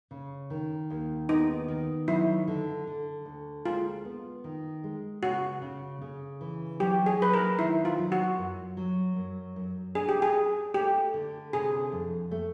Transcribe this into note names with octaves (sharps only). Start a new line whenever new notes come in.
C#3
D#3
D#2
B3 D#4
D#3
F#3 E4
D3
D3
D2
G#3 F4
B3
D#3
G#3
C#3 F#4
C#3
C#3
E3
F#3 G4
G#4
F#3 B4
A#4
D#3 E4
F4
F#3
F#4
F#2
F#3
F#2
F#2
D4 G#4
G4
G#4
D4
A3 G4
D3
C3 G#4
F2
A3